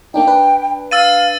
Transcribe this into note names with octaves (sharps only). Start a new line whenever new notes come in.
A#3 D4 D#4 G5
D4 B4
F5 E6 A6 D#7